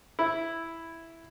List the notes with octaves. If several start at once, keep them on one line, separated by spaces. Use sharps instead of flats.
E4